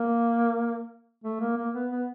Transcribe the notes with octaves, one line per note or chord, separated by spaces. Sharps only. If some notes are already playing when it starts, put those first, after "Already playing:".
Already playing: A#3
A3
A#3
A#3
B3
B3